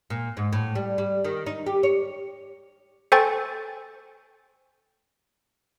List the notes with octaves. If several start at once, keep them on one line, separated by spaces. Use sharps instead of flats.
A#2
G#2
A2
G3
G3
D#3
D#4
G4
C#5
A4 C5 G5 G#5 C#6 A6